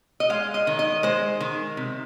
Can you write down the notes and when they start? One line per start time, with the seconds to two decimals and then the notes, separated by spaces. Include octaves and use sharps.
0.20 D#5
0.30 G#3 F5
0.54 D#5
0.67 D#3
0.79 D#5
1.03 G#3 C5
1.40 D#3
1.77 C3